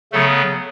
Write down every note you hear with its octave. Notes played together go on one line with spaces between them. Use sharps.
C#3 F#3 A3 B3 A4